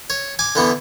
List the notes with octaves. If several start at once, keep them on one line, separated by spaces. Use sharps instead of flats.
C#5
G#5 D6
D3 E3 B3